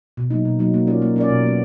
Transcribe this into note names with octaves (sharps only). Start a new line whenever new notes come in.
B2
F#3 A#3 D#4
B2
F#3 A#3 D#4
A#3
C#4 F4 A#4 D5
A#3
C#4 F4 A#4 D5
B2
F#3 B3